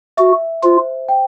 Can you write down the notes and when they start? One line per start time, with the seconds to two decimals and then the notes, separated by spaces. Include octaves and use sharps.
0.17 F#4 E5
0.63 F4 C5
1.09 G5